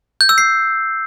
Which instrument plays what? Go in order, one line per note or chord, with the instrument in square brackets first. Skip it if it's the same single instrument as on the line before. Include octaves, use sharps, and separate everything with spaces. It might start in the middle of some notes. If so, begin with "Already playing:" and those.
[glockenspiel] G6
E6
C7